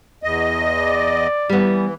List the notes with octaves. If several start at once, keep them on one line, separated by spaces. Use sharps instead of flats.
E2 D#5
D5
E3 G3 B3